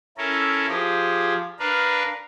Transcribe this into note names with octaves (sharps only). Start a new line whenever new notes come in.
C#4 E4 A4 A#4
F3 G4 G#4
D4 A#4 B4 F5